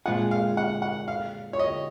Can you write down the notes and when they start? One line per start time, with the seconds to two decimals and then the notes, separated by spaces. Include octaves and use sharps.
0.06 A#2 G#3 C4 F4 G#4 F#5
0.31 F5
0.57 F#5
0.82 F#5
1.08 F5
1.53 C#5
1.59 D#5